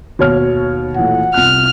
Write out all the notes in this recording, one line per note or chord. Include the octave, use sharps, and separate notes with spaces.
D#2 B2 C#5 F6
A#2 E3 A3 F#5
C2 F4 F6 F#6